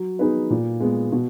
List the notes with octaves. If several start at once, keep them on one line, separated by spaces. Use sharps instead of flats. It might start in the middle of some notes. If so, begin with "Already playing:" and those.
Already playing: F#3
B3 D#4 G#4 B4
A#2
G#3 B3
B2